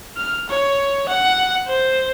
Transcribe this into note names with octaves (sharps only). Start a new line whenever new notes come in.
F6
C#5
F#5
C5